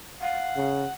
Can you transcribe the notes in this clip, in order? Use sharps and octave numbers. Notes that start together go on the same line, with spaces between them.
F5 F#5
C#3